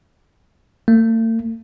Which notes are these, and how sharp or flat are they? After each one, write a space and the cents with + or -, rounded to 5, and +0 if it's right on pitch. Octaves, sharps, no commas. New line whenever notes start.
A3 +45